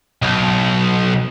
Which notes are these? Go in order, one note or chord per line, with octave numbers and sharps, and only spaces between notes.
B1